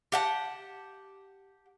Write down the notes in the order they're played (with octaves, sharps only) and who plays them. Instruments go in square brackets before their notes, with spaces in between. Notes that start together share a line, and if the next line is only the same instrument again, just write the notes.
[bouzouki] G4 F#5 A5